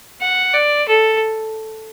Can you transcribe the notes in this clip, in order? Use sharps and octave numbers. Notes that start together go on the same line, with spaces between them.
F#5
D5
A4